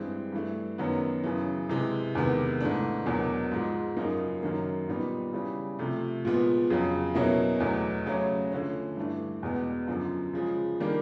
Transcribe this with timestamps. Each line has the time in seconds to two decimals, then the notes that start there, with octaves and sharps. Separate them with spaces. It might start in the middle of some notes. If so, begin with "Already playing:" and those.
Already playing: G2 E3 G#3 C4
0.33 G2 E3 A3
0.78 F#2 D#3 F#3 B3
1.24 F#2 C#3 E3
1.70 C3 E3 G#3
2.15 E2 C3 D#3 G#3 B3
2.61 G#2 E3 A3 D4
3.06 E2 B2 F#3 A#3 D4
3.51 G#2 F3 G#3
3.97 F#2 C#3 F3 A#3 D#4
4.43 F#2 D#3 F#3 A#3
4.88 A#2 G3 B3 D#4
5.33 C#3 E3 G3
5.79 C3 F3 A3
6.25 A#2 F3 G#3 B3
6.70 F2 C#3 F#3
7.15 B2 F#3 A#3 C#4 E4
7.60 E2 B2 F#3 A3
8.06 C#3 F#3 A3 C#4
8.52 D3 F3 A3 C#4
8.97 G2 E3 A3 D4
9.43 E2 B2 G#3 B3
9.88 F#2 D3 F3
10.33 C#3 F3 G#3
10.80 D#3 G3 A#3 D4